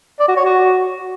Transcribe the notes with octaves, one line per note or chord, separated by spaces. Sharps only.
D5
F#4
C#5
F#4